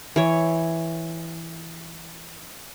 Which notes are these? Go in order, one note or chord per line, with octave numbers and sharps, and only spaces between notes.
E3 C#5